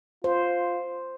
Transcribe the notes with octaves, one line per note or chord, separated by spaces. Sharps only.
F4 C5